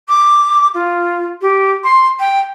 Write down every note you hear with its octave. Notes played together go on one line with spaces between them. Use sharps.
D6
F4
G4
C6
G5